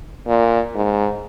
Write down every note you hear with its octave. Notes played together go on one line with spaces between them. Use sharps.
A#2
G#2